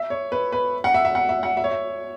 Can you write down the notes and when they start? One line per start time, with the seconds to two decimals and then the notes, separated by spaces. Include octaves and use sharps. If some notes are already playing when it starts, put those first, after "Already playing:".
Already playing: E5
0.10 C#5
0.32 B4
0.52 B4
0.84 F#5
0.94 E5
1.05 E5
1.15 F#5
1.29 E5
1.43 F#5
1.57 E5
1.64 C#5
1.71 E5